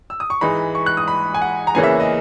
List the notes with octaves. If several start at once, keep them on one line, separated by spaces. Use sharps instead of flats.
E6
D#6
C#6
G#2 E3 G#3 D#4 B5
C#6
F#6
D#6
B5
G#5
F#5
A#5
E2 C#3 E3 A#3 C#4 G#5
E5
D#5